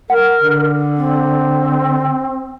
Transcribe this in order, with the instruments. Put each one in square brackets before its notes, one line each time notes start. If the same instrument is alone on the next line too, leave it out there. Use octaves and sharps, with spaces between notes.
[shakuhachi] A#4 [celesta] F#5
[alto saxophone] D3
[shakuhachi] C4